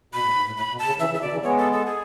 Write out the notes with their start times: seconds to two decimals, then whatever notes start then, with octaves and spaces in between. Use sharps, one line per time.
0.13 B2 B5
0.25 A2
0.35 G#2
0.46 A2
0.56 A2 B5
0.72 B2
0.79 A5
0.86 C#3
1.00 C#3 E3 E5
1.10 C#3 E3
1.14 E5
1.21 B2 D3 D5
1.32 C#3 E3
1.43 G#3 B3 C#5
1.58 A4
1.73 A4
1.86 G#4